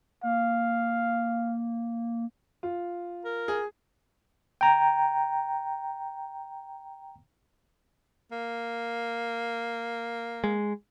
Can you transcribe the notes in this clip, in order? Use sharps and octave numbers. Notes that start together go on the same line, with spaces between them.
A#3 F5
F4
A#4
G#4
G5 A#5
A#3
G#3